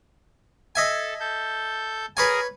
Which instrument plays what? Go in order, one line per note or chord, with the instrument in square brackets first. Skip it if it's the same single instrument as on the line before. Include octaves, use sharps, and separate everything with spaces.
[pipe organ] A4 [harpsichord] D#5 E5 G#5
[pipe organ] A4 G6
[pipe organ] G#4 A#4 [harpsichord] B4 C#5 G#5